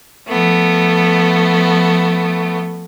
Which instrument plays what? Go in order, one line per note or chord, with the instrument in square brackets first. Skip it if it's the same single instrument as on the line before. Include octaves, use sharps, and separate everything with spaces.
[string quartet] F3 A3 B3